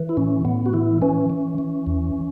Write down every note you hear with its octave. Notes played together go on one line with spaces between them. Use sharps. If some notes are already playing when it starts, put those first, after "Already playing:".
Already playing: E3
E4
A2 C#4
A2 B3
F#4
E3 E4
E3 C#4
E3
E3
E2